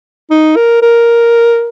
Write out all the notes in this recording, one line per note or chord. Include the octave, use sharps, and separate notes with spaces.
D#4
A#4
A#4